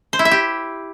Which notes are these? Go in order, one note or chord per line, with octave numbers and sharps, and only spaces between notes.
C5
E4
E5
G4